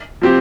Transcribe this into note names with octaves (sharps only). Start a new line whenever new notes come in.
F3 C4 G4